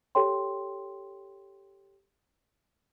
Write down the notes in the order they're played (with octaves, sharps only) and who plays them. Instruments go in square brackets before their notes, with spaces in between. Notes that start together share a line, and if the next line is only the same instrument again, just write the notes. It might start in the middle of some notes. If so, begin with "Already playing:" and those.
[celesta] G4 A4 C#5 G5 C6